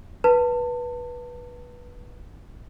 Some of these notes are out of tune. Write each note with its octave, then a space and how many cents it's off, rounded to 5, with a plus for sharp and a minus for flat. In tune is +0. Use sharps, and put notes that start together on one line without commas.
B4 -15 A5 +30